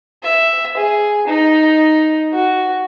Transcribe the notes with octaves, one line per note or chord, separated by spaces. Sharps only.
E5
G#4
D#4
F#4